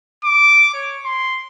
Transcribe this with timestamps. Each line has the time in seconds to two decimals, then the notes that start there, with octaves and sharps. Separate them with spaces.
0.24 D6
0.74 C#5
1.05 C6